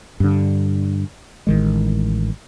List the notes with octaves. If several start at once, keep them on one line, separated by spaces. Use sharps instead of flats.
G2 D3
A1 D#3 G#3